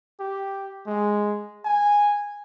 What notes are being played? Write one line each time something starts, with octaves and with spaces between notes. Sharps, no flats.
G4
G#3
G#5